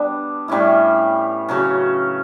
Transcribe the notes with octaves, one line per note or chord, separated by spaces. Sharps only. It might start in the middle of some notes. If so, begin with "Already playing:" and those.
Already playing: G3 B3 D4
A2 G3 C#4 E4
C#3 F#3 C#4